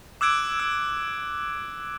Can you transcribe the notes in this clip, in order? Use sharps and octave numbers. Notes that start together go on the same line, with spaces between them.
D6 E6 F#6 G#6 D7
E6